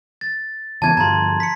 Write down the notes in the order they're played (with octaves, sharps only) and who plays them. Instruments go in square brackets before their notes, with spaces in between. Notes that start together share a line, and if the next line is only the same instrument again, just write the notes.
[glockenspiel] A6
[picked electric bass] C#3 E3 B3 [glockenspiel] A5 G#6
[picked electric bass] G2 D3 F3 [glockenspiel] A#5 C6
[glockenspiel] B6 C#7